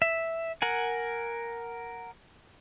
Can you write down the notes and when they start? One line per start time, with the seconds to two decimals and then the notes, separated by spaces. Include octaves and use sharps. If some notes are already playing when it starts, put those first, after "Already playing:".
0.02 E5
0.62 A#4 F#5 G#5